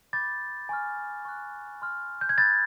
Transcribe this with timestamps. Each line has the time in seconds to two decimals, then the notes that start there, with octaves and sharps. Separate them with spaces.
0.13 B5 D6 G6 A6
0.69 G#5 C#6 F6
1.25 C#6 F#6
1.82 C6 F6
2.21 G6
2.29 G#6
2.38 B5 D#6 G6 A6